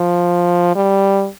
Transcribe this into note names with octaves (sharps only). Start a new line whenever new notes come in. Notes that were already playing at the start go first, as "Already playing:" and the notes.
Already playing: F3
G3